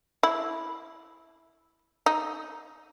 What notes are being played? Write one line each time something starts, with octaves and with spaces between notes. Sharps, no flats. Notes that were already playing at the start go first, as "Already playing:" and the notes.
E4
D#4